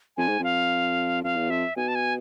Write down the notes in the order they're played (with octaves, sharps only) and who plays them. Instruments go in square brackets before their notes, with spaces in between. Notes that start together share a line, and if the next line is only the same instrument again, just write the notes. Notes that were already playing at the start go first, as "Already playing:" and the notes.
[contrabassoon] F2 [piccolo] G#5
[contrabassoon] G#2
[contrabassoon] F2 [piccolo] F5
[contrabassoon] F2 [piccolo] F5
[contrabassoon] E2
[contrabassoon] F2 [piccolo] E5
[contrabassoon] B2 [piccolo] G#5
[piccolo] A5
G#5